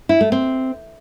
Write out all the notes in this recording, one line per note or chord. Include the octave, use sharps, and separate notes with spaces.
E4
A3
C4